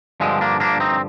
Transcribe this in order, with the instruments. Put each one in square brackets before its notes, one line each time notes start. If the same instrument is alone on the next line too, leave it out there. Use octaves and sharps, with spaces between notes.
[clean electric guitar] G2 D3 F3 G#3 C4
A#3 D4
A#3 D4
C4 D#4